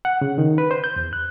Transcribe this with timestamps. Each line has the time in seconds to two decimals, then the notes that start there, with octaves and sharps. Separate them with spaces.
0.05 F#5
0.21 C#3
0.38 D#3
0.58 B4
0.71 C5
0.84 G6
0.96 E2
1.13 F#6